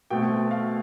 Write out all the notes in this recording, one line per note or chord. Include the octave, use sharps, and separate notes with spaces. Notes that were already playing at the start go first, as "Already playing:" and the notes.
B2 A3 C4 G5
F5